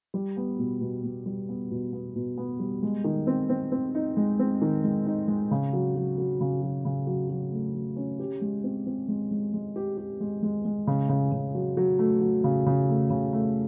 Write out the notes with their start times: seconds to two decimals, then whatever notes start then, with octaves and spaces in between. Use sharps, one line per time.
0.14 G3
0.37 B3
0.59 B2
0.81 B2
1.04 B2
1.26 G3
1.49 B3
1.71 B2
1.93 B3
2.16 B2
2.38 B3
2.59 G3
2.83 G#3
3.04 D#3
3.27 C4
3.49 C4
3.72 C4
3.95 D#4
4.17 G#3
4.39 C4
4.62 D#3
4.84 G#3
5.06 D#4
5.28 G#3
5.51 C#3
5.73 F#3
5.96 F#3
6.18 F#3
6.41 C#3
6.62 F#3
6.85 C#3
7.07 F#3
7.30 F#3
7.52 A3
7.74 F#3
7.96 C#4
8.20 G4
8.41 G#3
8.64 C4
8.86 C4
9.08 G#3
9.31 G#3
9.54 G#3
9.76 G4
9.97 G4
10.20 G#3
10.42 G#3
10.65 G#3
10.87 C#3
11.09 C#3
11.32 C#3
11.55 F#3
11.77 F#3
11.99 A3
12.21 F#3
12.44 C#3
12.66 C#3
12.89 A3
13.10 C#3
13.33 A3